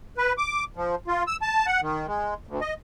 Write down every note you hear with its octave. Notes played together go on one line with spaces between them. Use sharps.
B4
D6
F3
F4
E6
A5
F#5
D#3
G#3
D2
D#5